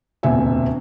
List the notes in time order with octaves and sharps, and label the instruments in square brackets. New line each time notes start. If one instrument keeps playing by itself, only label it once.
[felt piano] E1 D2 A#2 C4 E5 G#5